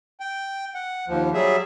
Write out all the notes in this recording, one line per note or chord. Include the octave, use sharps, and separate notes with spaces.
G5
F#5
D#2 F3
F#3 G3 G#4 E5